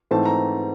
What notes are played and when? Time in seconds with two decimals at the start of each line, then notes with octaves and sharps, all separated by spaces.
0.11 G#2 E3 A3 C4 A5
0.25 A#5